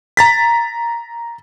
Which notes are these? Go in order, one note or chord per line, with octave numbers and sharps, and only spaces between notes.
A#5 A6 B6